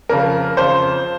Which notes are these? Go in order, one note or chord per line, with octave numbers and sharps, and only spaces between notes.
F2 C#3 F3 A#4
F2 C#3 F3 C5